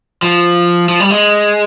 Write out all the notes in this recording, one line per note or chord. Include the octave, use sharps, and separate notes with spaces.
F3
F3
G3
G#3